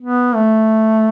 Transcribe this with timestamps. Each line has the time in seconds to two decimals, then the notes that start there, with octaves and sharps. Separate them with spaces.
0.01 B3
0.35 A3